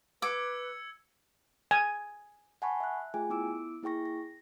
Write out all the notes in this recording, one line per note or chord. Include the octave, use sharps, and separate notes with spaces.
B4 D6 E6 G#6 C#7
G#5
F#5 G#5 A5 B5 C#6
E5 F#6
A3 F4 G#4 G5 G#5
B3 E4 D6 E6 D7
A#3 E4 G#4 G5 C#6 A#6
A#6